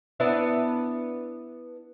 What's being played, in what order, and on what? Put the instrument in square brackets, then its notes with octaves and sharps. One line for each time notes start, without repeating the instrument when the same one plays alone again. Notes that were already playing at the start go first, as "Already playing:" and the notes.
[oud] B3 D4 E4